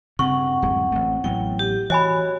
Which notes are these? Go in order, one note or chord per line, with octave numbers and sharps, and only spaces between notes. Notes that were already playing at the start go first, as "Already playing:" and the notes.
G2 C#3 C4 F#5 C#6
D1 F#2 G#3
A1 A3
A1 A2 F#3 B3 G5
G4
E3 F#4 C#5 D#5 G#5 B5